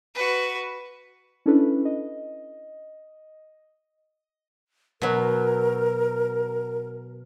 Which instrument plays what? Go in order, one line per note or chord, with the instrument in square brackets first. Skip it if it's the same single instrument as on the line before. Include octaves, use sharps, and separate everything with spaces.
[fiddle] F#4 B4
[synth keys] C#4 D4 E4 A4 B4
D#5
[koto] B2 F#3 [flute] A#4